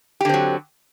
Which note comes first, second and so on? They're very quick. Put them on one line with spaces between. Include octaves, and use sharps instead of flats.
G4 D3 C4 F#3